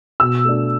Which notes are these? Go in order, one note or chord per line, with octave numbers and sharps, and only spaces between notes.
B2 E6
A3 D4